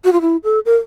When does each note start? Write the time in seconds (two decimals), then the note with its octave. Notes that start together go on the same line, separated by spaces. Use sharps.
0.04 F#4
0.13 F4
0.21 E4
0.44 A4
0.66 A#4